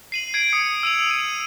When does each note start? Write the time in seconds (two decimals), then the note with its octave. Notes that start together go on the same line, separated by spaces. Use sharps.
0.12 C7 D#7 F#7
0.34 G#6 C7 D7
0.52 D#6 C#7
0.83 E6 D#7 F7
1.11 D#7